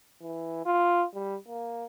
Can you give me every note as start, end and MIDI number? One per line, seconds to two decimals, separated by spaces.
0.22 0.63 52
0.66 1.05 65
1.15 1.36 55
1.48 1.86 58